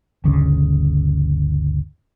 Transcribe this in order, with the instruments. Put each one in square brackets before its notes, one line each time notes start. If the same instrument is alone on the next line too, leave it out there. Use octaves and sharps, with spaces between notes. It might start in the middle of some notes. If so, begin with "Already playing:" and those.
[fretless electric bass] G1 D2 C#3